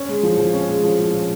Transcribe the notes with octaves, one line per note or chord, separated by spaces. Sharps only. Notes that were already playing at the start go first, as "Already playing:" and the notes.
Already playing: C#4
G#3
F3
F3
C#4
G#3
F3
F3
C#4